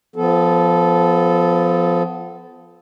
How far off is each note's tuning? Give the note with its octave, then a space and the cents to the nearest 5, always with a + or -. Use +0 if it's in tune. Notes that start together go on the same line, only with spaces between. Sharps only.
F3 +0 B3 +25 A4 -15